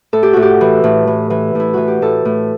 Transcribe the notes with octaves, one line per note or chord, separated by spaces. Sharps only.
A2 A4
G4
A2 F#4
G4
E3
A2
E3
E3
A2 E4
E3 F#4
G4
A2 A4
A2